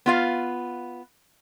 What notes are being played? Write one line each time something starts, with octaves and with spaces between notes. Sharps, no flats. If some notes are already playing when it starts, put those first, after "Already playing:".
B3 F4 F5